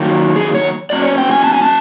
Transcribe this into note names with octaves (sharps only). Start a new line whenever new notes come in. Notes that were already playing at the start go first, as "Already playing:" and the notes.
Already playing: D#3 F#3 A#3
G#4
C#5
F#3 A#3 C#4 D5
C#5
G5
G#5
A5
G#5
A5